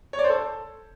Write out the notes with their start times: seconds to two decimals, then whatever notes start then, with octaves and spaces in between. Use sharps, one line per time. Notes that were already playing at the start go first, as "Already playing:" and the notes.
0.13 C#5
0.19 D5
0.24 C5
0.30 A4